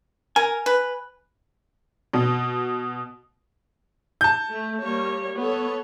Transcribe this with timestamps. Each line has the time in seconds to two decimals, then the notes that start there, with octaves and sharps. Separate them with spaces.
0.36 A#4 G#5
0.66 B4
2.13 B2
4.21 A5 G6
4.52 A3
4.82 G3 A#3 C#5
5.39 B3 A4 C#5